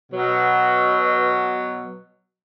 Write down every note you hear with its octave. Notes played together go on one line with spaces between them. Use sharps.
B2 F#3